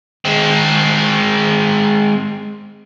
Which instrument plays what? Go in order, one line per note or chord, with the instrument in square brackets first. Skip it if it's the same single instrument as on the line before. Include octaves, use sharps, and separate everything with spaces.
[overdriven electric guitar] G#3 C4